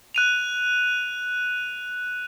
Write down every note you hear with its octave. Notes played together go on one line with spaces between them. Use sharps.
F#6 D#7 F7